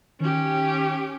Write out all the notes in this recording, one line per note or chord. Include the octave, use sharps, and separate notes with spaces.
D#3 C#4 G4